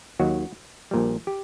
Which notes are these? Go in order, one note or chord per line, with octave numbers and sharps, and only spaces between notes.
D#2 D#3 F#3 F#4
A#1 A#2 G3
G4